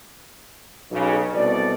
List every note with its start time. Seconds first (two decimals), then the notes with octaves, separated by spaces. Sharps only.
0.91 B1 C#3
1.34 C2 B2 A4 D5